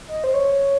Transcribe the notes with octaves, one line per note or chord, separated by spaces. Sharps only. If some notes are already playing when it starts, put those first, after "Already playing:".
D#5
C5
C#5